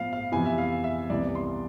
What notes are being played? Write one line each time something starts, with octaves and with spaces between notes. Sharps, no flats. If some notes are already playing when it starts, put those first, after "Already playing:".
Already playing: A2 F3 B3 F5
F5
F2 C3 E3 B3 G#5
E5
F5
E5
C2 C3 E3 B3 D5
C6